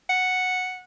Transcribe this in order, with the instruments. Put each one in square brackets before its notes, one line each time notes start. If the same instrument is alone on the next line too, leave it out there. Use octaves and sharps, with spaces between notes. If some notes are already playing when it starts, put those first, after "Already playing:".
[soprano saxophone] F#5